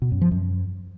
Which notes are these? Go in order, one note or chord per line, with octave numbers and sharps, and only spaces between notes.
B2
F#2
F3
F#2